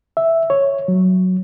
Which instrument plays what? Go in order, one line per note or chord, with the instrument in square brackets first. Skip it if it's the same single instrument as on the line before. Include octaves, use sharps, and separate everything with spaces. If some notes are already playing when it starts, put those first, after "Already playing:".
[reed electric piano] E5
C#5
F#3